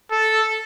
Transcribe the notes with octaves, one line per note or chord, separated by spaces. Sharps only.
A4